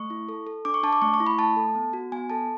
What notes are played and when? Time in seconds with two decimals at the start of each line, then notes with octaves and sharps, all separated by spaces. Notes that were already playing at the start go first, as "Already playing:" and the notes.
Already playing: A3 C#6
0.10 E4
0.29 A4
0.47 A4
0.65 D4 D6
0.74 C#6
0.83 D4 A5
0.93 D6
1.02 A3 C#6
1.14 C#6
1.20 E4
1.27 B5
1.39 A3 A5
1.57 A4
1.75 B3
1.93 F#4
2.12 B3 G#5
2.30 A4 A5